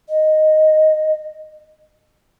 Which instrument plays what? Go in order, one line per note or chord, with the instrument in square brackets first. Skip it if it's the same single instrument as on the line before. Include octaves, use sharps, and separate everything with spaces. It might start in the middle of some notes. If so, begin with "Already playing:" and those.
[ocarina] D#5